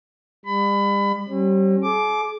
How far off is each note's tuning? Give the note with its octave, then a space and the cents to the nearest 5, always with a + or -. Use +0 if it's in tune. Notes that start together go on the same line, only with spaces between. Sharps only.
G3 +40 B5 +25
G3 -30 C#4 -45
G#4 +45 D6 +0